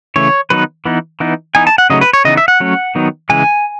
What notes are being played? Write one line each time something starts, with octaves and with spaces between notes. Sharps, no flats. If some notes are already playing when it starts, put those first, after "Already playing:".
C#3 E3 A3 C#5
D#3 F#3 B3 D#4 B4
E3 B3 D#4
E3 B3 D#4
E3 B3 D#4 G#5
A5
F#5
C#3 F#3 A3 D#4 D#5
B4
C#5
C#3 E3 B3 D#4 D#5
E5
F#5
F#3 A3 C#4
D#3 F#3 B3 D#4
C#3 E3 G#3 G#5